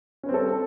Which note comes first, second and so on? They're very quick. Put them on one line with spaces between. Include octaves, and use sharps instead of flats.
C#4 B4 C4 G3 A4